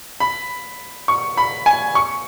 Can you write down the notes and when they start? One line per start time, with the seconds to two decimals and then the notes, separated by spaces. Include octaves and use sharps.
0.20 B5
1.08 C#6
1.37 B5
1.66 G#5
1.95 C#6